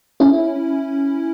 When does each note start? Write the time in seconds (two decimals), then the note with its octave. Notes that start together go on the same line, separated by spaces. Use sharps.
0.20 C#4 E4